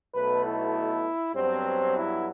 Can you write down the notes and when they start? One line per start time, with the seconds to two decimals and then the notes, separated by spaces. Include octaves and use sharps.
0.15 B1 B2 A3 B4
0.45 E4
1.36 G2 F#3 B3 C4
1.96 E4